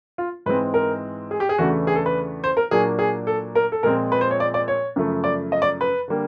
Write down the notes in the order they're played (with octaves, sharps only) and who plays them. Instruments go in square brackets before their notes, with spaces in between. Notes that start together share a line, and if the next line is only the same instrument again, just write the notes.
[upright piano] F4
G#2 E3 G#3 C4 B4
A#4
G#4
G4
G#4
E2 C#3 E3 A3 D4 F#4
G#4
A4
B4
C5
A#4
A#2 F#3 A#3 D4 G#4
G#4
A4
A#4
A4
A#2 F3 G#3 C4 A#4
B4
C5
C#5
D5
D5
C#5
F#2 C#3 F3 A3
D5
D#5
D5
B4
D3 G3 A#3